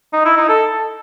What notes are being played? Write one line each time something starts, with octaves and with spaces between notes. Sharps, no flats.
D#4
E4
D#4
A4